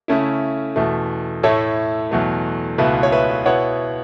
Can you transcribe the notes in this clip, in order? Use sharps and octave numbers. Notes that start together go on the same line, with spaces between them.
C#3 A3 C#4 E4
E2 B2 A3
A2 A3 E4 A4 C#5
E2 B2 F#3 A3
C#2 B2 A3 E4 B4
C#5
B4 E5
B2 B3 E4 C#5 F#5